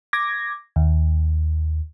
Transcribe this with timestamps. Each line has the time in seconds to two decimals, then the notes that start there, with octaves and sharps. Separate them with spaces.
0.13 D6 G#6 A#6
0.76 D#2